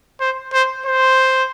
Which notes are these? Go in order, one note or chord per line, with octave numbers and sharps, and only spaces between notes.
C5
C5
C5